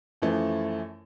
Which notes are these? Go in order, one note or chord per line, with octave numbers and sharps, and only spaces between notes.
F#2 E3 F3 A3